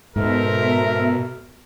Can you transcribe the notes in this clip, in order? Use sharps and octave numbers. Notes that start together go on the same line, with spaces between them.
G#2 B2 A4 A#4 C5 E5